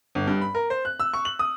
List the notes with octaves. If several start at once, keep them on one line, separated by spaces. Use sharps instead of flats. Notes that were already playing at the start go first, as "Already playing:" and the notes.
G1
G2
B5
A#4
C5
F#6
E6
C#6
F#7
D#6